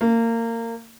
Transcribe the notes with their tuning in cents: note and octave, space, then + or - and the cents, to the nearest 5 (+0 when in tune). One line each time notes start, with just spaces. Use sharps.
A#3 -25